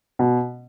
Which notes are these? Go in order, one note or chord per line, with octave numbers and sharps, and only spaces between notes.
B2